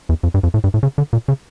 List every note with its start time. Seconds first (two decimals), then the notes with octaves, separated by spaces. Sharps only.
0.09 E2
0.23 F2
0.34 G2
0.43 F2
0.54 A2
0.64 G2
0.74 A2
0.83 C#3
0.98 D3
1.13 A#2
1.28 C#3